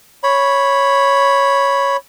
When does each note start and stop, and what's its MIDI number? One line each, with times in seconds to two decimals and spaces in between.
0.23 1.97 73
0.23 1.97 83